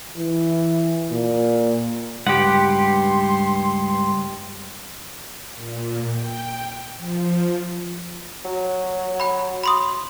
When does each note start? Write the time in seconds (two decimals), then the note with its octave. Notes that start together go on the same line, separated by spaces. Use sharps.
0.16 E3
1.11 A#2
2.27 C#2 G2 B3 G4 F#5 C6
5.55 A#2
6.11 G5
6.98 F3
8.45 F#3
9.20 F#5 B5
9.64 B5 C6 D#6